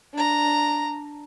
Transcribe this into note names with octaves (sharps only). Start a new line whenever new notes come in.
D4 A#5